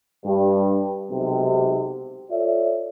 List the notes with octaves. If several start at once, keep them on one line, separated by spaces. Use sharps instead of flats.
G2
B1 G#2 C3
F4 A4 C#5 D5 E5